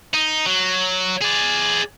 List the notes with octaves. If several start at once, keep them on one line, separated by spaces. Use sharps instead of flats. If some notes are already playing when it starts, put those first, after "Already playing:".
D#4
F#3
G#4 D5